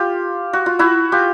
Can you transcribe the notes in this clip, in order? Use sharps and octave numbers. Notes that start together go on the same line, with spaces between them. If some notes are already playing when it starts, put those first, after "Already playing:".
Already playing: F4 G4
F#4
F4
E4 F#4
F4 G4